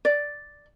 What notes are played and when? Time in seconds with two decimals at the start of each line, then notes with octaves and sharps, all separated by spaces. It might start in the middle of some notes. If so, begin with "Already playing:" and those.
0.05 D5